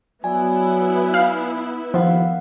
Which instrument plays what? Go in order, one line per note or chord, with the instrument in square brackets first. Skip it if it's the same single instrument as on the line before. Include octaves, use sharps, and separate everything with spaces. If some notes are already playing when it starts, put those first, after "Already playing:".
[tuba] F#3 [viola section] B3 E4 [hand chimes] D5 G#5
[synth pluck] F5
[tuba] D#2 [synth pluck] F3 [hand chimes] F5 F#5